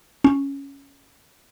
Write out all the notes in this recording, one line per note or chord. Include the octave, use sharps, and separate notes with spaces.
C#4